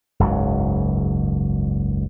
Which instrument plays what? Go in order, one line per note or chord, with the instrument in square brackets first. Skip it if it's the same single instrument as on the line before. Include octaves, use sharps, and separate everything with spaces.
[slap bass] F#1 C#2 G#2 F#3